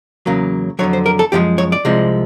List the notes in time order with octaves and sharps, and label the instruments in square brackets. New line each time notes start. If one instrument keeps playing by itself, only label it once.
[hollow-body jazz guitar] E2 C#3 F#3 A#3
F2 D3 F#3 C#5
C5
A#4
A4
F#2 D3 F3 G#3 G4
C#5
D5
C2 C3 F3 G#3